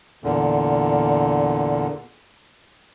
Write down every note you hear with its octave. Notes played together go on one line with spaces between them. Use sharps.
E2 A#2 D3